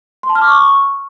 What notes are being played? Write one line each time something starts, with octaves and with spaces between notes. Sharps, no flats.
C6
A5
F6
D6
C#6